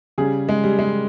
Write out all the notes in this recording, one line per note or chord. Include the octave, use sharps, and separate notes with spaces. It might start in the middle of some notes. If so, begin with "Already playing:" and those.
C#3 G3 G#4
G#3
G3
G#3